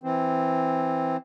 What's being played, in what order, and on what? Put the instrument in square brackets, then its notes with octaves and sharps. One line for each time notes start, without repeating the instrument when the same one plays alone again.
[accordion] E3 C4